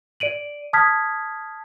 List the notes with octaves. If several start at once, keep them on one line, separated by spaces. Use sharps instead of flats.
D5 D7 D#7 F#7
A5 D#6 F6 G#6 B6